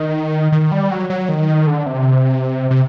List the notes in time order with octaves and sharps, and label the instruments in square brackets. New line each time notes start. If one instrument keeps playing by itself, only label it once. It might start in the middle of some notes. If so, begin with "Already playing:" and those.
Already playing: [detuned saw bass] D#3
D#3
G3
F#3
F#3
D#3
D3
C3
C3